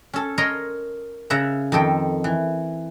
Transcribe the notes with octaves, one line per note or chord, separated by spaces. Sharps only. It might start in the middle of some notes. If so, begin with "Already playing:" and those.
C#4 A4
A#4 C#5 D#5 A#5 C6
C#3 E5 F#5 A#5
F2 D#3 A4 G5
E3